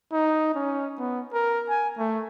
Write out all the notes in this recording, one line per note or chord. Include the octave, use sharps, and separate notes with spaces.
D#4
C#4
B3
A#4
G#5
A3